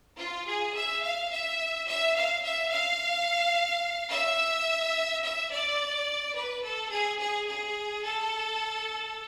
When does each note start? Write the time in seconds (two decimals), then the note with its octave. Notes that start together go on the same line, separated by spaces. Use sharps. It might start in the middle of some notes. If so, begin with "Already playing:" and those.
0.19 F4
0.47 G#4
0.75 E5
1.03 F5
1.31 E5
1.87 E5
2.15 F5
2.43 E5
2.71 F5
4.11 E5
5.23 E5
5.51 D5
6.35 B4
6.64 A4
6.91 G#4
7.19 G#4
7.47 G#4
8.04 A4